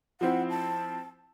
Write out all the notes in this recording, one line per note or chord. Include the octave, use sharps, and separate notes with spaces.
F3 C4 E4 F#5
A5